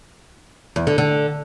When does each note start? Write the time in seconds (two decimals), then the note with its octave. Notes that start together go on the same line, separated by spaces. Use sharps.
0.76 E2
0.87 D3
0.98 D3